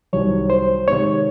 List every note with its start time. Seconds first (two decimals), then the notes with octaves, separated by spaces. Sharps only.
0.13 C2 C3 D#3 F#3 C4 C#5
0.50 C5
0.88 C3 D#3 G#3 C#5